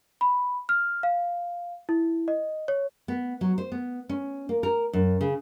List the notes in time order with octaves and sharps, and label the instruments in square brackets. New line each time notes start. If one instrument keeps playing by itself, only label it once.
[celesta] B5
F6
F5
E4
D#5
C#5
[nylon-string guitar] B3
F#3
C5
B3
C#4
A#3
A#4
F#2
C#3